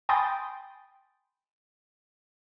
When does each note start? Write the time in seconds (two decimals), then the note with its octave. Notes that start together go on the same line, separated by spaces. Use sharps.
0.09 G5 G#5 B5 C6 D#6 A6